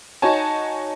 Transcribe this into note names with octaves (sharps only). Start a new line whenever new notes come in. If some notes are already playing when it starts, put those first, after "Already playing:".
D#4 F#4 C#5 G#5 A5